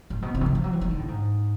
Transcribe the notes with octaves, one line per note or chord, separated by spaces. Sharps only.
A2
B2
C3
D#3
D3
F3
F#3
E3
D#3
D3
A2
G#2